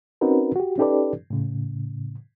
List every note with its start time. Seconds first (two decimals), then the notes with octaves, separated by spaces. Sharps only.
0.21 C4 C#4 D#4 F#4 A#4 B4
0.55 F#4 G4
0.78 C#4 D#4 G4 A4 B4 D5
1.30 A2 C#3